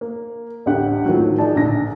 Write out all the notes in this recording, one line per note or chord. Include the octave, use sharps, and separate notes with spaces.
A#3
A1 D2 G4 F#5
A2 D#3 F3 F#3
D4 D#4 G#4 D5 A5
A#1 D3 A#6